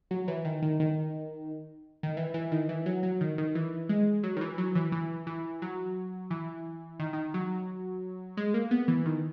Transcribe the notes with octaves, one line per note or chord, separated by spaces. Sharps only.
F#3
E3
D#3
D#3
D#3
D#3
E3
E3
D#3
E3
F#3
F#3
D#3
D#3
E3
G#3
F#3
D#3
E3
F#3
E3
E3
E3
F#3
E3
D#3
D#3
F#3
G#3
A#3
B3
E3
D#3